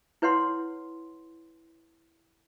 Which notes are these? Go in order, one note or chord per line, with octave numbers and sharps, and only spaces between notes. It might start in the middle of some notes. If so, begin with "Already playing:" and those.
E4 B4 C#5 F#5 C6